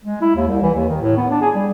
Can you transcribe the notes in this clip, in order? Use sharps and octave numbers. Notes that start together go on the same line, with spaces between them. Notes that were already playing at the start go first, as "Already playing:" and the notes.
G#3
E4
D#2
C2
E3
D#2
D#3
A2
B3
D4
G#4
G3